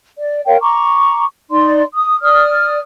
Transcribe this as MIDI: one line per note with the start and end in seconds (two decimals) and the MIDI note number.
0.19 0.41 74
0.47 0.57 70
0.47 0.57 73
0.47 0.57 77
0.47 0.57 79
0.61 1.24 82
0.61 1.24 85
0.61 1.24 86
1.51 1.82 63
1.51 1.82 74
1.51 1.82 84
1.95 2.22 87
2.22 2.79 74
2.22 2.79 87
2.22 2.79 89